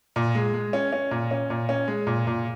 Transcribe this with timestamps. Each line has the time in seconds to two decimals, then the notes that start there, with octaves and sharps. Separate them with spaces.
0.16 A#2
0.35 G#3
0.54 G#3
0.73 C#4
0.93 C#4
1.11 A#2
1.31 C#4
1.50 A#2
1.69 C#4
1.88 G#3
2.07 A#2
2.27 A#2